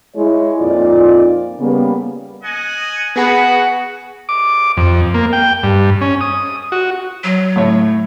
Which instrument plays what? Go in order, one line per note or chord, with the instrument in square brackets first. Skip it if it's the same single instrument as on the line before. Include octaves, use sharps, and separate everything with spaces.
[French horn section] G#3 E4 C#5
F2 A#2 D#4 F4 D5
C#3 G3 A#3 B3
[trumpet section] D#5 F#5 G#5
[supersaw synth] B3 G#4 B4 [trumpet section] F#4 [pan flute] F#5
[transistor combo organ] D6
F2
A#3
G5
G2
C#4
D#6
F#4
[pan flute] F#3
[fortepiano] A2 C#5